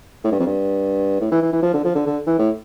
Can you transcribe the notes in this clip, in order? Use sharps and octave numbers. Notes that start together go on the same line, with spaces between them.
A2
G2
F2
G2
A2
E3
E3
E3
F3
D3
F3
D3
D3
E3
A2